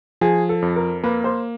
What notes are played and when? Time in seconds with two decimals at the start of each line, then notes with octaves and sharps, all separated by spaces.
0.21 F3 G#4
0.49 A4
0.62 F2
0.76 A#4
1.03 A#3 B4
1.24 C5